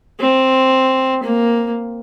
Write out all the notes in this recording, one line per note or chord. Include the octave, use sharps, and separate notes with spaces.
C4
A#3